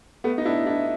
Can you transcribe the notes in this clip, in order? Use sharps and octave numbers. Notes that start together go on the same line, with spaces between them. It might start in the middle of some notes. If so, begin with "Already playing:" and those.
A3 B3
D#4
D4 E4
D4 E4